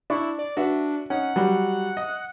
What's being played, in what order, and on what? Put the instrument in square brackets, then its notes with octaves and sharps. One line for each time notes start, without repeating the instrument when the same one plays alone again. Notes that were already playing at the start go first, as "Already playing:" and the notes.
[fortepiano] D4 C#6 [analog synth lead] E4
[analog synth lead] D5
[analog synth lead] D4 [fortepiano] F#4 B4 E5
[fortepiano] C#4 D#4 [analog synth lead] F#5
[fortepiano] F#3 G3
D#5